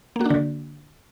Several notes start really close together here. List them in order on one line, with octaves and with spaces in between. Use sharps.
A#3 F#4 D4 D3